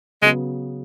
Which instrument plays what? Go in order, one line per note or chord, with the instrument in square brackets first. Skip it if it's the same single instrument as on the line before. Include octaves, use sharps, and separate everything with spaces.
[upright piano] C#3 F#3 B3 [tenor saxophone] G#3